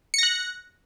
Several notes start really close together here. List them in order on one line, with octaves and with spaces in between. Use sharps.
C#7 A#6 F#6